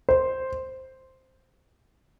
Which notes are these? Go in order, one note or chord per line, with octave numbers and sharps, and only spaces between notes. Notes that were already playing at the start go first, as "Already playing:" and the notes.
C5